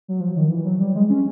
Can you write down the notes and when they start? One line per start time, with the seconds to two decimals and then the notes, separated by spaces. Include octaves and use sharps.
0.08 F#3
0.20 F3
0.36 D#3
0.50 E3
0.65 F#3
0.80 G3
0.95 G#3
1.10 C#4